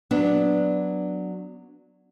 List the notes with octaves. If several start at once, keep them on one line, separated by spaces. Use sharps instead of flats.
F#3 B3 D4